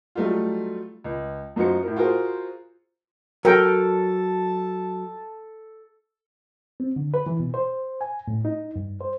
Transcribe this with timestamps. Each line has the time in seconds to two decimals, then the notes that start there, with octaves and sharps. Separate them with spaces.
0.15 F#3 G3 A3 D#4 F4
1.04 C#2
1.56 F#2 D#4 F4 F#4 C5 C#7
1.83 A2 E4 A#4
1.97 F4 F#4 G#4 A#4 C5
3.45 F#3 A4 A#4 G5 A5
6.80 C4
6.96 D3
7.14 B4
7.26 E3
7.40 B2
7.54 C5
8.01 G#5
8.28 A2
8.45 D#4
8.76 G2
9.01 C5